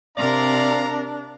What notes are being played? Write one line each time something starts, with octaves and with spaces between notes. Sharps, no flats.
C3 C4 D4 A#4 D5 F5 A#5